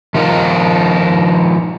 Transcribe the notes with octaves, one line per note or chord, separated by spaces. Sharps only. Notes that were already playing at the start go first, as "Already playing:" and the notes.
D#3 F3 D#4 F4